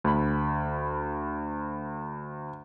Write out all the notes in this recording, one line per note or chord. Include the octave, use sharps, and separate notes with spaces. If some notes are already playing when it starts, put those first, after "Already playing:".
D2 B5